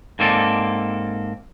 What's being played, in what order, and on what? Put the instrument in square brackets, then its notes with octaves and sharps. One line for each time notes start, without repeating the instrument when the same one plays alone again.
[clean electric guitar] G#2 A#3 C4 A4 D5